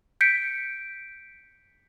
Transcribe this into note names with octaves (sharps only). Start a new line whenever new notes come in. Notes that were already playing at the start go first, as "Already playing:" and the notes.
G6 B6 C#7 D7